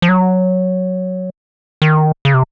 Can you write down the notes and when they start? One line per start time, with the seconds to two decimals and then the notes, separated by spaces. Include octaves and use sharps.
0.02 F3
0.09 F#3
1.82 D#3
2.25 C#3
2.34 C3